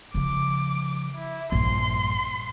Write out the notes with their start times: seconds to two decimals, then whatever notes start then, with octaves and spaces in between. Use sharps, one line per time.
0.14 C#3 F3 D6
1.16 E4
1.52 A#1 G2 C6